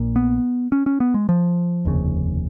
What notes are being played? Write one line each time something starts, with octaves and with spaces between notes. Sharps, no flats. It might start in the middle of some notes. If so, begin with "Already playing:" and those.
Already playing: A#1 A#2
B3
C#4
C#4
B3
G#3
F3
F1 D#2 C#3